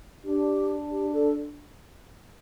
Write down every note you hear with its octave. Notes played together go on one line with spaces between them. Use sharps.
D4 G4
G4
A4